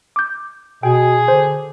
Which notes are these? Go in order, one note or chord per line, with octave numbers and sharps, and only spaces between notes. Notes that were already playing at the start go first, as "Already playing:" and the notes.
D6 G6
B2 G#4 G5
D3 C5